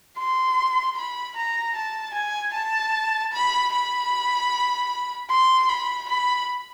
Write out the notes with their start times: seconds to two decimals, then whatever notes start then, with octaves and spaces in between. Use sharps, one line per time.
0.18 C6
0.96 B5
1.36 A#5
1.75 A5
2.14 G#5
2.53 A5
3.32 B5
3.72 B5
5.30 C6
5.69 B5
6.08 B5